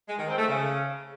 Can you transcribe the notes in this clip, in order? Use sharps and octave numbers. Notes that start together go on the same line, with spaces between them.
G#3
D#3
C4
A3
C#3